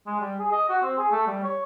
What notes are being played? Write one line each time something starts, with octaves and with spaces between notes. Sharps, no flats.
G#3
G3
G#4
D#5
F#4
C4
G#4
A3
G3
C#5